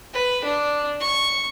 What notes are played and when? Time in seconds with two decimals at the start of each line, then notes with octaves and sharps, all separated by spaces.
0.13 B4
0.44 D4
1.00 C#6